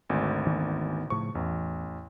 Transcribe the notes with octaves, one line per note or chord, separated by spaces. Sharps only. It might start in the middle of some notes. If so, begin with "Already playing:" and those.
G#1 D2
D#3 E3 B3
A2 C#3 F3 C#6
A1 E2